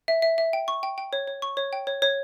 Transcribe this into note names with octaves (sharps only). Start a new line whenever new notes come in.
E5
E5
E5
G5
C#6
G5
G5
C#5
C#5
C#6
C#5
G5
C#5
C#5